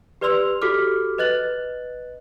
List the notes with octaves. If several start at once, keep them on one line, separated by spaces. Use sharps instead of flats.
G4 B4 D5 C6 E6 F7
F#4 G4 A4 D6 F6
B4 D#5 F#6 A6 F#7